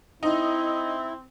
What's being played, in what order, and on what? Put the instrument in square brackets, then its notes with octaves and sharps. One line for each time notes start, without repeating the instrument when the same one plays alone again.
[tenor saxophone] C4 [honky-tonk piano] D#4 [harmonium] E4